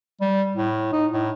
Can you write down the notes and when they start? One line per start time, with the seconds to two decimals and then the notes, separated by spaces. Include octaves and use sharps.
0.21 G3
0.55 A2
0.92 D#4
1.11 A2